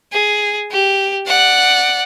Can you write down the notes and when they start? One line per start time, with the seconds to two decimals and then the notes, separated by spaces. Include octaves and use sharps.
0.13 G#4
0.72 G4
1.27 D5 F#5